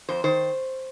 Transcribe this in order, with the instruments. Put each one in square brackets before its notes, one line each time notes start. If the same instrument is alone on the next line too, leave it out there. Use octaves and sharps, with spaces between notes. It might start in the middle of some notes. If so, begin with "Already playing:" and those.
[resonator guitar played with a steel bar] F2 C5
D#3 C5